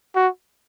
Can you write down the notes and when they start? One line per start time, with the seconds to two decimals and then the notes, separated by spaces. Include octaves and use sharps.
0.15 F#4